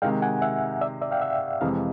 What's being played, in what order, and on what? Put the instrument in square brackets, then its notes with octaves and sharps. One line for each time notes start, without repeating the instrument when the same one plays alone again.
[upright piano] C3 D#3 G#3 [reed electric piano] F5 G5
[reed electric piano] F#5 G#5
E5 F#5
D5 E5
D5 E5
F5 G5
E5 F#5
[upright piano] F2 C3 E3 G#3 [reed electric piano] D#5 F5